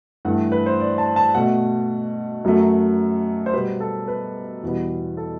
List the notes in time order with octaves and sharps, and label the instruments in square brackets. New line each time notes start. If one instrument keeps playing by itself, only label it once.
[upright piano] G2 E3 A3 F#5
B4
C5
D5
A5
A5
B2 A3 F#5
F#2 F#3 A3
C5
B2 G3 B3 B4
A4
B4
E2 B2 G3 B3
A4